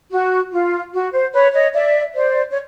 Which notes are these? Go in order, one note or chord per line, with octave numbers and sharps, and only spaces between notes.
F#4
F4
F#4
C5
B4 C#5
C#5 D#5
D5 E5
C5 D5
C#5